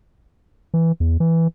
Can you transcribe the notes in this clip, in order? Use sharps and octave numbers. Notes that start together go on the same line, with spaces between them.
E3
E2
E3